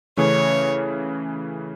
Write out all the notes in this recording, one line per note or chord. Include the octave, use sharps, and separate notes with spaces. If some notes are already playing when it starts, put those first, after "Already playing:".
C#3 E3 A3 C#4 C#5